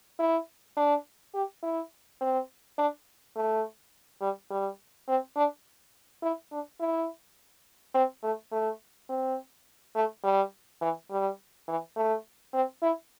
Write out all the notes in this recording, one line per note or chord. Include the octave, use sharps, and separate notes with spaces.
E4
D4
G4
E4
C4
D4
A3
G3
G3
C4
D4
E4
D4
E4
C4
A3
A3
C4
A3
G3
E3
G3
E3
A3
C4
E4